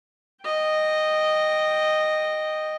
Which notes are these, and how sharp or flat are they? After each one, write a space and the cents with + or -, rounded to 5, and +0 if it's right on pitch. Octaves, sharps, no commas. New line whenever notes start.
D#5 -10 G5 +0